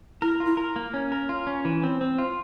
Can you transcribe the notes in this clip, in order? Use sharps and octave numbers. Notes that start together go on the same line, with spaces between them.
E4 A#4
F4
E4
A#4
A#3
C#4
A#4
F4
C#4
E3
C4
C4
F4